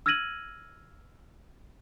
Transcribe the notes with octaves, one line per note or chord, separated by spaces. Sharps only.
E6 F6 G#6 A#6 D#7 F#7